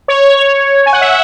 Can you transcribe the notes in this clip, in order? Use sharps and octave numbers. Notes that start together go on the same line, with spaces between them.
C#5
G#5
F#5
E5
F#5